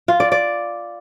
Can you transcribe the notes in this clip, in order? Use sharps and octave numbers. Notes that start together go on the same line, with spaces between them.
F4
D5
D5